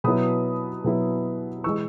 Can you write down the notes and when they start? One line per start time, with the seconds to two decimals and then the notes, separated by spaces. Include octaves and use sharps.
0.04 B2 F#3 B3 E4 B5 D#6
0.84 B2 F#3 B3 E4
1.64 E3 G#3 C#6 E6